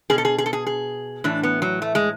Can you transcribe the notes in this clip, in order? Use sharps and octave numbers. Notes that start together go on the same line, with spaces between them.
B2 G#4
A4
G#4
G#4
A4
G#4
G#4
A2 E3 D4
B3
F#3
A3
G#3